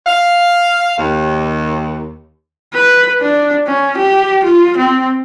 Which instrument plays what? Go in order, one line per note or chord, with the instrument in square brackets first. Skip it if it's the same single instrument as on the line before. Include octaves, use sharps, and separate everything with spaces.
[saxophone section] F5
D#2
[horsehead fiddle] B4
D4
C#4
G4
F4
C4